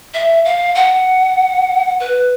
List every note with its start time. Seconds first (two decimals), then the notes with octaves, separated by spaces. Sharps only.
0.14 E5
0.45 F5
0.75 F#5
2.00 B4